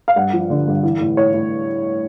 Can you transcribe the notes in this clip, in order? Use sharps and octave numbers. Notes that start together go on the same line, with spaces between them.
F5
G2 F#5
F3
D3
G2
E3
A2
A2 C#5
A2